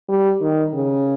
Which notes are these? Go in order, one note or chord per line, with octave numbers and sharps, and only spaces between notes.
G3
D#3
C#3